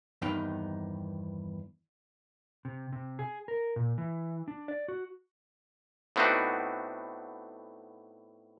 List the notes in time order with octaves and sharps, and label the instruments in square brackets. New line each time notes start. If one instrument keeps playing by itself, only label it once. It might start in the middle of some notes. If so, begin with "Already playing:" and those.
[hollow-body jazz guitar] E2 G2 D#3 C4 D#4 G5
[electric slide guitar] C3
C3
G#4
A#4
A#2
E3
D4
D5
F#4
[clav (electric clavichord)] A2 B3 C4 D4 D#4 F#4